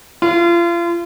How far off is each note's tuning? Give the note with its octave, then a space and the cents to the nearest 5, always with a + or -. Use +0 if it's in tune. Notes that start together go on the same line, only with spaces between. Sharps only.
F4 -35